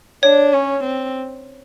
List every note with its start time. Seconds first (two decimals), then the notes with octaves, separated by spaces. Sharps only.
0.23 D4 C#5
0.53 C#4
0.84 C4